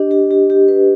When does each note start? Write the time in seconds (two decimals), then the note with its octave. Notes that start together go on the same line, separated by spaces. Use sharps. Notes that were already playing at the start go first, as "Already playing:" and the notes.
Already playing: D4 G4 D#5
0.11 G4
0.31 G4
0.50 G4
0.68 B4